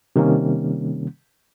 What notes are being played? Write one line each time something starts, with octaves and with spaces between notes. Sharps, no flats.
C3 D#3 G3 A#3 C#4